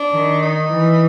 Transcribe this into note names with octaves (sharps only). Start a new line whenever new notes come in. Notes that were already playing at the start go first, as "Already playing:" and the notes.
Already playing: D4
D#3
D#4
E3